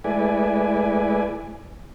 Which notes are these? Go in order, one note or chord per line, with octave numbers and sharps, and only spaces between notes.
G#3 A3 E4 B4 D5 G#5